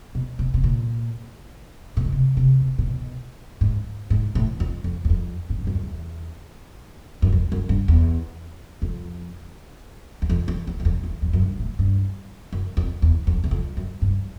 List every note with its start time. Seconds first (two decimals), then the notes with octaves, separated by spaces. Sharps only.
0.15 B2
0.39 B2
0.54 B2
0.64 A#2
1.97 A#2
2.05 B2
2.12 C3
2.37 C3
2.61 B2
2.78 A#2
2.87 B2
3.61 G#2
4.10 G#2
4.35 A2
4.60 F2
4.84 F2
5.05 F#2
5.10 F2
5.50 G#2
5.58 G2
5.67 F#2
5.75 F2
5.84 E2
7.22 F#2
7.32 F2
7.52 F#2
7.69 G2
7.88 E2
8.82 F2
10.22 E2
10.30 F2
10.48 F2
10.67 E2
10.80 F#2
10.85 F2
11.04 E2
11.22 F2
11.33 F#2
11.42 G2
11.59 A2
11.79 G2
12.52 F#2
12.77 F2
13.02 E2
13.27 F2
13.44 E2
13.51 F2
13.77 F#2
14.02 G2